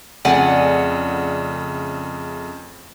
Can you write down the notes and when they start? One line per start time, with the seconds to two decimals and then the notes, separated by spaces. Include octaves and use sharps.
0.25 F2 C#3 A3 D5 F#5 G#5